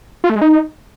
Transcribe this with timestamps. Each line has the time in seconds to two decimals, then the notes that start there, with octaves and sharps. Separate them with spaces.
0.24 F4
0.30 A3
0.36 G#3
0.41 D#4